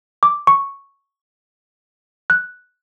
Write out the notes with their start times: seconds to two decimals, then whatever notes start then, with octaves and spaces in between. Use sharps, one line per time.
0.23 D6
0.47 C#6
2.30 F#6